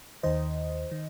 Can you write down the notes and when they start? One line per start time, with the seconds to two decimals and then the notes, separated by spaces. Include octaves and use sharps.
0.23 D#2 D#3 C5 D#5
0.91 D#3